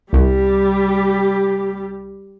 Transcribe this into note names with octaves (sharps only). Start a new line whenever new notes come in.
C2 G3 G4